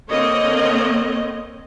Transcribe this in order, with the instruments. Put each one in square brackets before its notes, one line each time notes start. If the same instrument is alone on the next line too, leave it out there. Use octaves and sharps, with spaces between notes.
[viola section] D3 A#3 C4 C#5 D#5